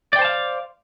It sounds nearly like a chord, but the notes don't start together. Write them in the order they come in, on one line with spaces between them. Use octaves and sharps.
D5 G5 C5 A5 F5